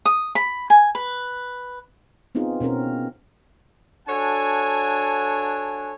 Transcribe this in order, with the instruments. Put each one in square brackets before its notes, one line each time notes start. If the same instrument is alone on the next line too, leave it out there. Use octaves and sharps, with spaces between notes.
[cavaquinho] D#6
B5
G#5
B4
[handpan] B3 C4 D#4 F4 G#4
B2 C4 C#4 A#4
[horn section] D4 F#4 A4 C#5 F#5 G#5